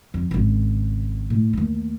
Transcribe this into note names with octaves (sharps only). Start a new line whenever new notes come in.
F2
G#1 C#3
A2
D#2 A3